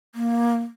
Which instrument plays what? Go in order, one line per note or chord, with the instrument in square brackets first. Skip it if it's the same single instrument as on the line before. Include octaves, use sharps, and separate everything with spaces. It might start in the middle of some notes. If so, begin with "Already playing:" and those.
[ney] A#3